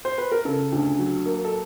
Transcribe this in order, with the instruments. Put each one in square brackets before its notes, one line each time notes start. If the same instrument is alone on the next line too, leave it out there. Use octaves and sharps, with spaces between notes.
[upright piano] C5
B4
A#4
C#3 A4
D2
F#3
A#3
A4